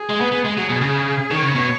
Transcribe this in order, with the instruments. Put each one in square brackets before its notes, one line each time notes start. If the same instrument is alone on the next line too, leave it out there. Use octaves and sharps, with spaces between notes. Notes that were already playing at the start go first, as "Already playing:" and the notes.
Already playing: [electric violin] G#4
[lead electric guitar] G#3
B3
B3
G#3
[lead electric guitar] F#3 [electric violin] G#4
[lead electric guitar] B2
C#3
[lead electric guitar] D#3 [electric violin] C#5
[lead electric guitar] C#3
B2